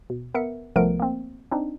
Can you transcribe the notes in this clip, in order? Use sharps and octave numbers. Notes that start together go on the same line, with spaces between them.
B2
B3 A#4 E5 C#7
C2 F3 A3 B3 A#4 D7
A#3 C4
C4 D4 D#4